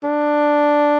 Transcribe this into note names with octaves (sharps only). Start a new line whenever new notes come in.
D4